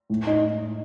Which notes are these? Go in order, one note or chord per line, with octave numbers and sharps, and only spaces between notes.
A2
D#4